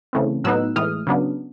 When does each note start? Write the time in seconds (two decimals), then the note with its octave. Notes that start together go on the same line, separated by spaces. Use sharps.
0.13 C#3 E3 A3 C4
0.44 A2 F#3 B3 D#4 E6 F#6
0.76 A2 E3 G#3 D#6 F6
1.07 C#3 F#3 B3 D4